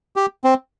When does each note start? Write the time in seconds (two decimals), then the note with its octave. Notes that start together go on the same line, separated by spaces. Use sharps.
0.16 G4
0.44 C4